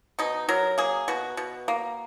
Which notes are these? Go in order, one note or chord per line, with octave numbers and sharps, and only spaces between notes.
B2 D#4
F#3 A#4
A#3 G#4
B2 F#4
B2
A#3